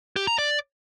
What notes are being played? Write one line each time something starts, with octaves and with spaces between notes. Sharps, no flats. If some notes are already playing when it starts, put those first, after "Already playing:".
G4
A#5
D5